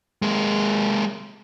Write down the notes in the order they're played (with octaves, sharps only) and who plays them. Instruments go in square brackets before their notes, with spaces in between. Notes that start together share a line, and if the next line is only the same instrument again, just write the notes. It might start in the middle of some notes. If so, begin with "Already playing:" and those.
[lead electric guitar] G#3 A#3